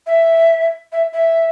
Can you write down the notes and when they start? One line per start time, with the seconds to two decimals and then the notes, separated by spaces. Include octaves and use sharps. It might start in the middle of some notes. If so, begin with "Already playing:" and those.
0.07 E5
0.92 E5
1.13 E5